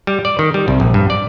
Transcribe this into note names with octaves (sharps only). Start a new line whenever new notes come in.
G3
D5
D#3
G3
C2
A#1
G2
D5